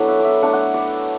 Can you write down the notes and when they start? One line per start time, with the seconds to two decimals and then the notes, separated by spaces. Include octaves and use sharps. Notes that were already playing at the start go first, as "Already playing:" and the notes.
Already playing: F#3 B3 D4 E4 F#4 A4 B4
0.09 E5
0.20 D5
0.25 E5
0.42 A3 D4 F#5
0.53 F#5
0.74 D5